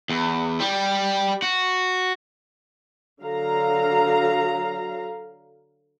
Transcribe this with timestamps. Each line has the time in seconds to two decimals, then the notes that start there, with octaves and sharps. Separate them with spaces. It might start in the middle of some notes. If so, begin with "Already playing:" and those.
0.09 E2
0.60 G3
1.42 F#4
3.21 D3 F#3 F5 A#5